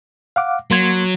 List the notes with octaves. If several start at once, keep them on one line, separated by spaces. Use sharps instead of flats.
F5 F#5 D6
F#3 A#3 C6 G#6